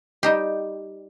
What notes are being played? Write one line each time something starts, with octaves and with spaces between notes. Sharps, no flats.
G3 D#4 G4